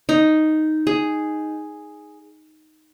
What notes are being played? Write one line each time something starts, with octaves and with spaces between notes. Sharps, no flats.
D#4
G#4